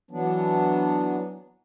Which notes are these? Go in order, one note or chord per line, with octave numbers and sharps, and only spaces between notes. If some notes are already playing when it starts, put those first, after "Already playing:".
E3 F#3 B3 D4